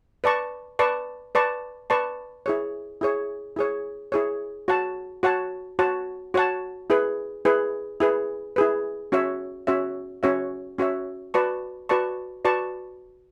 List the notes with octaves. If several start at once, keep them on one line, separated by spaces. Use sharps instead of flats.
B4 D5 A5 C#6
B4 D5 A5 C#6
B4 D5 A5 C#6
B4 D5 A5 C#6
E4 G#4 C#5
E4 G#4 C#5
E4 G#4 C#5
E4 G#4 C#5
F#4 C#5 F#5 A5
F#4 C#5 F#5 A5
F#4 C#5 F#5 A5
F#4 C#5 F#5 A5
E4 G#4 B4
E4 G#4 B4
E4 G#4 B4
E4 G#4 B4
C#4 F#4 C#5 E5
C#4 F#4 C#5 E5
C#4 F#4 C#5 E5
C#4 F#4 C#5 E5
F#4 B4 D5 A5 C#6
F#4 B4 D5 A5 C#6
F#4 B4 D5 A5 C#6